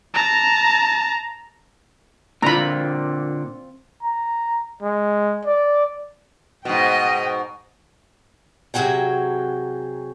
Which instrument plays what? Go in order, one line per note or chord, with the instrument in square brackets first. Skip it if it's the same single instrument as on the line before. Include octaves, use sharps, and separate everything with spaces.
[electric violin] A5 A#5
[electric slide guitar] A#2 D3 [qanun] C4 F4 [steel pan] A#5 B5
[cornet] A#5
G#3
D5
[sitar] G#2 B2 [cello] D#5 G5
[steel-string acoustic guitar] C3 F#3 A#3 F#4 G#4 G5